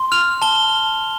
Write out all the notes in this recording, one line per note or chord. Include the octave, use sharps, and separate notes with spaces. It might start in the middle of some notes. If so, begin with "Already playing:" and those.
Already playing: C6
F6 F7
A5 G7